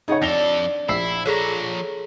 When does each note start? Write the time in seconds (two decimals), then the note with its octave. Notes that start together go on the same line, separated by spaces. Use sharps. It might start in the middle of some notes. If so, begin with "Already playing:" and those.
0.08 C#3 D#4 G#4 C#5 F#5
0.22 F2 D4 A4 A#6 F7 G7
0.89 A#1 E4 E6 C7
1.26 F3 G#4 A4 C#5 A#5